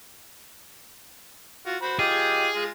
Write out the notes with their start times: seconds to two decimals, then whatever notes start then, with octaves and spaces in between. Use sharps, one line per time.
1.66 F4 F#4
1.82 F#4 C5 B5
1.99 F4 G4 G#4 D#5
2.55 G#3 F4